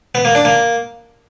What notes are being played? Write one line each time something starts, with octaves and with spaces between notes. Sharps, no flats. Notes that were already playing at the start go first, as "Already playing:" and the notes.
B3
A#3
D4
A#3